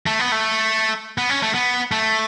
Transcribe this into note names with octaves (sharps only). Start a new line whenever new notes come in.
A3
B3
A3
B3
C#4
A3
B3
A3